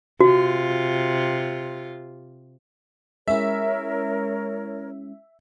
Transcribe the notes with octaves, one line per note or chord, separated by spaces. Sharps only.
C3 F4 F#4
G#3 C#4 E4 A#4 C#5 E5